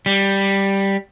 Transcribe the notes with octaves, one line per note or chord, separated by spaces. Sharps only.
G3